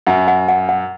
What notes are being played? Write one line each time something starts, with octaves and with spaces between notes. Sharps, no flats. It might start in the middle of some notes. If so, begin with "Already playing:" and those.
F#2 F#5
F#5
F#5
F#5